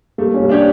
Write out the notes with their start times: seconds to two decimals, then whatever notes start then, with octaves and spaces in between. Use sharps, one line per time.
0.18 G3 A3 A#3
0.34 C#4
0.39 G3 A#3
0.49 D4 G4 C#5